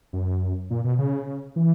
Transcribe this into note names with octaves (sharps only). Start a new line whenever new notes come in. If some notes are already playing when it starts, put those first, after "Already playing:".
F#2
A#2
B2
C#3
E3